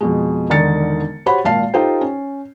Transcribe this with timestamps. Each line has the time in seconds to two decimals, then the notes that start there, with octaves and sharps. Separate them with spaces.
0.01 F2 B2 G#3
0.50 E1 D3 D#3 D#4 A6 C#7
1.26 F#4 G4 C5 C#5 F#5 B5
1.45 G#1 A#2 F5 A5 C7
1.74 D#4 F4 G4 A4 C5 G5
2.01 C#4